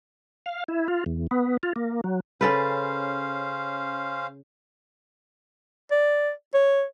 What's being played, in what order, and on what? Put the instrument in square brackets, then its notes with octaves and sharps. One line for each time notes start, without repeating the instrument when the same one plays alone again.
[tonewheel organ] F5
E4
F4
E2
B3
F4
A#3
F#3
[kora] C#3 A4 B4 [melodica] C#4 C5 F5
[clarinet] D5
C#5